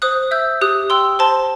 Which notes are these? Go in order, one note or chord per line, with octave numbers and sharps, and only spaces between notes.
C5 D#6 F#6
E5 E6 G6
G4 D#6 F#6
G5 C6 E6
C5 A5 C6